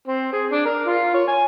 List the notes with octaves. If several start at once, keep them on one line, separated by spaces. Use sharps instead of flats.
C4
G#4
D4
A#4
F4
C#5
G#5